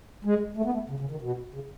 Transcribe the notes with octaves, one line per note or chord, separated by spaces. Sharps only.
G#3
A3
B3
A3
C#3
C#3
D#3
B2
C#3